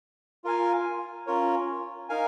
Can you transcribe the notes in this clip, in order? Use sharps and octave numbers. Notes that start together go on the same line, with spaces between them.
F4 A#4 F5 G#5
C#4 F4 A#4 C#5
D#4 A#4 F5 G#5